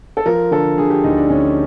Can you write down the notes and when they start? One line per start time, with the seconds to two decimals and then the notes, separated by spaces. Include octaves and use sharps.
0.17 A4
0.26 F3 A#4
0.51 D3 A4
0.78 D3 G#4
0.90 G4
1.04 D2 D#4
1.17 D4
1.30 D2 C#4